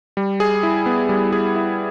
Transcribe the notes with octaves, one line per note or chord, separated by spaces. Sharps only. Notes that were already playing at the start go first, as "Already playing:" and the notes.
G3
G#4
E4
B3
G3
G#4
E4